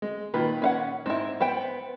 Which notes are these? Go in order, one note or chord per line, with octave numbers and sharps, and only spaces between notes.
G#3
A#2 D#3 B4
C#4 F5 F#5
G#2 C4 E4
B3 C5 G5